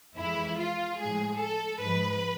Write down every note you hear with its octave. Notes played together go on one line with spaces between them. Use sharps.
F2 E3 G#3 E4
F4
A2 F3 G#3 G#4
A4
G#2 F3 G#3 B4